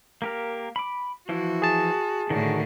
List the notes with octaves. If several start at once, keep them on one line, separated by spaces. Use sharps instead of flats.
A#3 G4 A#4
B5 D6
E3 F3 E4 F#4
G#4 A5
A2 D3 D#3 F#4 A#4